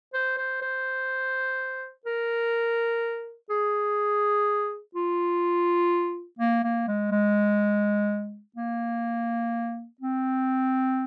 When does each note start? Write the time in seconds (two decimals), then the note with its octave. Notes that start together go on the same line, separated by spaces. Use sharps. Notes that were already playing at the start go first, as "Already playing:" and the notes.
0.14 C5
0.38 C5
0.62 C5
2.06 A#4
3.50 G#4
4.95 F4
6.39 A#3
6.64 A#3
6.87 G#3
7.11 G#3
8.56 A#3
10.01 C4